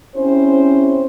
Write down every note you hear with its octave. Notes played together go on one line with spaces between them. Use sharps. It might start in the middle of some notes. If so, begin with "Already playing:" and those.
C4 C#4 E4 G4 C5 C#5